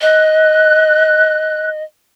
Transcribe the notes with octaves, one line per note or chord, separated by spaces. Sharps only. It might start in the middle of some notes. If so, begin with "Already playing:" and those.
D#5 F#6